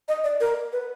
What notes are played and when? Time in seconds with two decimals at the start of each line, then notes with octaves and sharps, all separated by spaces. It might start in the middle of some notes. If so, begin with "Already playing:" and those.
0.08 D#5
0.24 D5
0.40 A#4
0.73 B4